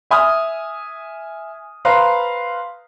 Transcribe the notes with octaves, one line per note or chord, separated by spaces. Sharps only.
E5 G#5 D#6 F6
B4 C5 F5 A#5 C6